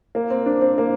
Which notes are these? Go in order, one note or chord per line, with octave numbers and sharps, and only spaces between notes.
A#3
C4
D4
C4
A#3